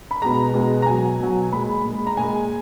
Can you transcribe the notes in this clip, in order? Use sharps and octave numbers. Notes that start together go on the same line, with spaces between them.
B5
B2 G#3 A#5
B2 G#3
A#5
B2 F#3 G#5
B2 F#3
A#2 G#3 B5
A#2 G#3
A#5
A#2 G#3 G#5